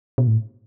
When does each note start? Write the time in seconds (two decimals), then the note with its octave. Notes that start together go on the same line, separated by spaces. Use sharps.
0.18 B2
0.27 A2